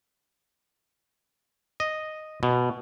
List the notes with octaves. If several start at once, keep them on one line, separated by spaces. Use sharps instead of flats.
D#5
B2